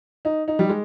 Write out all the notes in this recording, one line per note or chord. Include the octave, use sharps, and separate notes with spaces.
D#4
D#4
G3
G#3